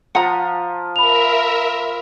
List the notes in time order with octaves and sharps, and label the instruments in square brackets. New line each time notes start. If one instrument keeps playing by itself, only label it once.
[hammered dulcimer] F3 [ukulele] F#5 A#5
[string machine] A#4 E5 [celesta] B5 F7